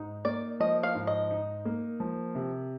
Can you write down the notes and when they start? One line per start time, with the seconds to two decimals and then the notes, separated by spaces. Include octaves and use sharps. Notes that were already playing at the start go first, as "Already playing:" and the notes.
Already playing: G#2 D#4
0.25 A#3 D5
0.60 F3 D#5
0.83 F5
0.95 G#2
1.07 D#5
1.31 D#4
1.65 A#3
2.00 F3
2.35 C3